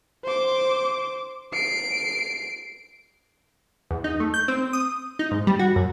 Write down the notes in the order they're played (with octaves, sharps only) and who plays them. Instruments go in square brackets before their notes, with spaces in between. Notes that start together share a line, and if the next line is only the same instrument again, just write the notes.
[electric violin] C5 D6
C7 D7
[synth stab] E2
D#4
A3
G6
C4
D#6
D#4
G#2
G3
F#4
F#2